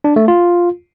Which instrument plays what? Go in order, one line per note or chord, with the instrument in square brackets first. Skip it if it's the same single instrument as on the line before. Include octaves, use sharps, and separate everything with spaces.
[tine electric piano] D4
A3
F4